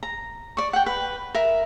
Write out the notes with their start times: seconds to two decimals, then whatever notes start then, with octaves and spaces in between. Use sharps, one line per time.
0.03 A#5
0.57 D5 C#6
0.73 F#5 G5
0.86 B4
1.35 A#4 E5